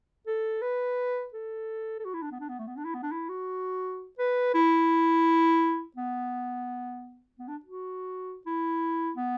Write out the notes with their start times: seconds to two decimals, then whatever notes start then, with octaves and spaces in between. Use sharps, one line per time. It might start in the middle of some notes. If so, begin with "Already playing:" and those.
0.27 A4
0.62 B4
1.34 A4
1.99 A4
2.05 F#4
2.14 E4
2.22 D4
2.31 B3
2.40 D4
2.49 B3
2.59 A3
2.67 B3
2.77 D4
2.85 E4
2.94 B3
3.03 D4
3.11 E4
3.29 F#4
4.19 B4
4.54 E4
5.96 B3
7.39 B3
7.48 D4
7.65 F#4
8.46 E4
9.16 B3